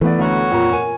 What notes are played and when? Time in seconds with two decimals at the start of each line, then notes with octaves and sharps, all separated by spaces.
0.01 E3 A3 B3 B4 D5
0.19 D2 C#4 F#4 A#5
0.51 F2 A#2 A#5
0.73 A#4 G#5